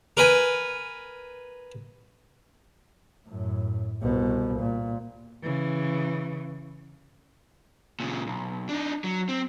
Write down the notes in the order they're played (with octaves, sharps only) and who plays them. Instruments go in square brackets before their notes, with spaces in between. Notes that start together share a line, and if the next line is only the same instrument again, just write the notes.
[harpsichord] A#4 B4 G#5
[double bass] F#2 A2
C2 B2
A#2
[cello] C#3 E3
[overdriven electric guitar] A#2 C#3
B1
D4 D#4
F#3
C4